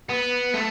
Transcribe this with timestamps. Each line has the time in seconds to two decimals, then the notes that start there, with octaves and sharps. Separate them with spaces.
0.09 B3
0.54 A3